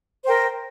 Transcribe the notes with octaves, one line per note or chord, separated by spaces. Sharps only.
A#4 C5 G5